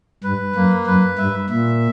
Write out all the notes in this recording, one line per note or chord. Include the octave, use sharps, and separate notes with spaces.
G2 B4
F#2 A#3
F#2 B4
G2 E5
A#2 E5